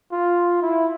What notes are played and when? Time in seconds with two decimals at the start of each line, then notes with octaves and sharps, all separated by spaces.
0.12 F4
0.62 E4